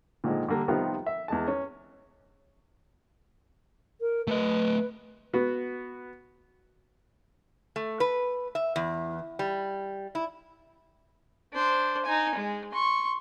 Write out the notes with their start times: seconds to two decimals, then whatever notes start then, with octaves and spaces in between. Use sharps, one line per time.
0.24 A#2 D3 D#3 F3 G#3
0.48 D3 G3 A#3 D4
0.68 C3 D#3 F3 G3 B3 F4
1.06 E5
1.28 E2 G#3 A5
1.48 C#4
4.00 A#4
4.28 A3 B4 D#5
5.33 B3 F#4
7.76 A3
8.00 B4
8.55 E5
8.76 E2
9.39 G3
10.15 E4
11.53 D4 C5
12.06 D#4 G#5
12.35 G#3
12.73 C6 C#6